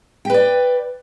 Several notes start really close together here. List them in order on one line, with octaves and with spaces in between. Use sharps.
G5 B4 D5